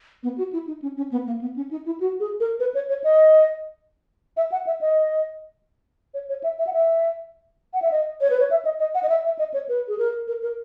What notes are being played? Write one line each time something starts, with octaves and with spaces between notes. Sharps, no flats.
B3
F#4
E4
D#4
C#4
C#4
B3
A#3
B3
C#4
D#4
E4
F#4
G#4
A#4
B4
C#5
C#5
D#5
E5
F#5
E5
D#5
C#5
C#5
E5
E5
F#5
E5
F#5
E5
D#5
C#5
B4
C#5
E5
D#5
D#5
F#5
D#5
E5
E5
D#5
C#5
B4
G#4
A#4
A#4
A#4